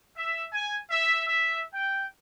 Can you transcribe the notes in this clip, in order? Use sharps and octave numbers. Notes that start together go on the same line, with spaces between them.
E5
G#5
E5
E5
G5